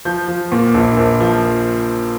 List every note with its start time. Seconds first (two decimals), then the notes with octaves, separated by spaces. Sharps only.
0.05 F3 G6
0.28 F3
0.52 A#2
0.74 A#1
0.97 A#1
1.21 F3